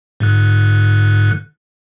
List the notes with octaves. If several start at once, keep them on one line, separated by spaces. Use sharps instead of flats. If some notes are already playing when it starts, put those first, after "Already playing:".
G#2 D3 F#6